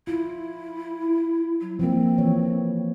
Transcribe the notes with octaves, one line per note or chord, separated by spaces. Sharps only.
E4 F4
F#3
F3 A#3 C4
E3 C#5